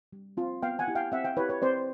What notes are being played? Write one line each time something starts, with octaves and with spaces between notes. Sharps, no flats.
G3
C4 F4
B3 F5 G5
F#5 G#5
E4 G4
F5 G5
C4 E5 F#5
F5 G5
E4 G4 B4 C#5
B4 C#5
C4 C5 D5